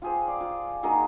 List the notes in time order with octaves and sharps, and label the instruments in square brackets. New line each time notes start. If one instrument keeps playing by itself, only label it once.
[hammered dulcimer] F4 G4 G#4 C5
D5
F4
D#3 A#3 F#4 G#4